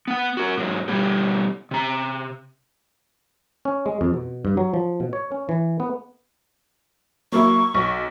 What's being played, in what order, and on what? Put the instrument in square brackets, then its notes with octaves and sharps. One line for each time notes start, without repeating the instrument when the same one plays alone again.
[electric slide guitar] B3 F#5
F#4 A#4
G#2 F#3
B2 G3 B3 G4
C3 A#5
[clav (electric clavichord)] C#4
G#3
F2
B2
G2
F#3
F3
B2
C#5
C#4
E3
B3
[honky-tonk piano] F#3 A#3 E4 [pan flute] C#6
[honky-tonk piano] B1